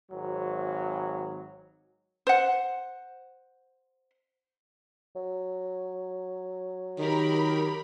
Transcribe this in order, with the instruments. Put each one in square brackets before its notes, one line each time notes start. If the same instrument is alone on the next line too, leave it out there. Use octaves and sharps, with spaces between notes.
[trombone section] G#1 F#3
[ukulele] C5 F#5
[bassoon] F#3
[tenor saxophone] D#3 [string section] G4 A#4 B5